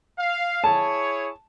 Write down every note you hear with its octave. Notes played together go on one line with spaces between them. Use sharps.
F5
E4 G#4 C#5 A5